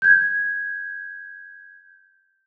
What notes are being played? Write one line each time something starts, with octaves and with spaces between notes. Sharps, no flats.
G6 G#6